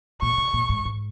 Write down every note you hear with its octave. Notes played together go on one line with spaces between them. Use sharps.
A#2 C#6
C3
A#2
G#2
G#2